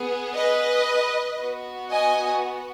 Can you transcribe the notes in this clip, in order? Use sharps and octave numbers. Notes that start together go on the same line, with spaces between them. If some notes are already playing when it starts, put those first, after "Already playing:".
Already playing: B3 G#4
B4 D#5
B3 F#4
D#5 G#5